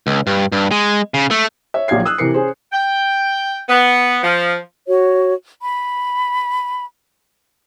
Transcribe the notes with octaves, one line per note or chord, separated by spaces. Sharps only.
C#2
G2
G2
G#3
C#3
A3
C#5 E5
A#1 A#2 F#3 F5 G#6 C7
D#6 E6 F#6
C3 E3 A#4 C7 C#7
C#4 G#4 C5
G5
B3
F3
F#4 C#5
B5